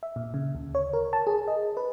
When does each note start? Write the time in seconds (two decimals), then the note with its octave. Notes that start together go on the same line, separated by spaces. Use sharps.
0.03 E5
0.16 A#2
0.34 C#3
0.55 D2
0.75 C#5
0.93 A#4
1.13 A5
1.27 G#4
1.48 D#5
1.77 B4